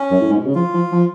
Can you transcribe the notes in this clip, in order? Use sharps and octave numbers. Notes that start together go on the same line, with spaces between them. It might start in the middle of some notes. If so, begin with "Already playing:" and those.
Already playing: C#4
F#2
A2
G#2
B2
C#3
F3 F4
F3
F3